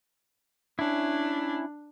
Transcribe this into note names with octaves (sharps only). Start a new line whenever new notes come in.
C#4 D4 E4